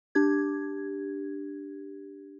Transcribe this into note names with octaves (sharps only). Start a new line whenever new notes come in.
D4 G4 G#6